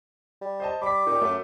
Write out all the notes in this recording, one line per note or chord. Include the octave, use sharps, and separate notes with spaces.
G3
C5 D#5 A5
G3 B5 D6 B6
A#2 D#4 G4
F#2 A3 A4